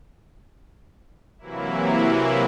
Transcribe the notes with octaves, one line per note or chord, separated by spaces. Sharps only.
C3 E3 F#3 A#3 E4